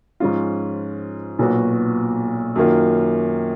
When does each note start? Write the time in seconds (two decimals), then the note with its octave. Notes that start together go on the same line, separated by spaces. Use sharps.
0.20 G#2 F3 G#3 C#4 F4
1.39 B1 A#2 F#3 B3 F#4
2.56 F#2 D#3 A#3 F4